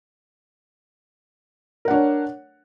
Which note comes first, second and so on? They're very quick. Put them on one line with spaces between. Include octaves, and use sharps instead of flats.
A#4 F#5 D4 C#5